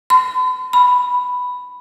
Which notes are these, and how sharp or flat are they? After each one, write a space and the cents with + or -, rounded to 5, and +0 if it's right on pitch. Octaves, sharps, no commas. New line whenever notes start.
B5 +45
B5 +5